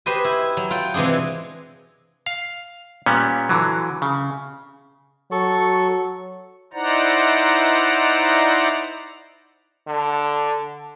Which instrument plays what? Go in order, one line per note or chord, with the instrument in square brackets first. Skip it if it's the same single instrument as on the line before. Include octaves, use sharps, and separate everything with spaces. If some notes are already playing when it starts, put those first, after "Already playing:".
[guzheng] G4 G#4 B4 C5 D#5 G#5
E4
F#3
F4 F#5 G5
C3 E3 G#3 D4 G#4
[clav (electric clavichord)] F5
A#2 G3 B3 C#4
D3 E3 F#3
C#3
[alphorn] F#3 [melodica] A4 C#6
[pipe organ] D#4 E4 C5 D5 F#5 A#5
[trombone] D3